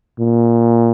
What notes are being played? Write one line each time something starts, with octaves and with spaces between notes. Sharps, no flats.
A#2